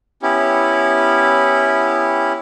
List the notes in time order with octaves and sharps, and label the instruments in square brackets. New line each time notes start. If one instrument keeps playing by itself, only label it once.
[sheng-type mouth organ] B3 C#4 E4 G4